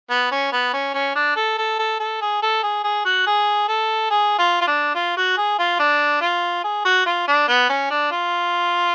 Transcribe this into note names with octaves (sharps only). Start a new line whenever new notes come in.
B3
C#4
B3
C#4
C#4
D4
A4
A4
A4
A4
G#4
A4
G#4
G#4
F#4
G#4
A4
G#4
F4
F4
D4
F4
F#4
G#4
F4
D4
F4
G#4
F#4
F4
D4
B3
C#4
D4
F4